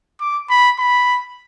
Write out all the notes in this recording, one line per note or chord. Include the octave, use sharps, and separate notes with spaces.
D6
B5
B5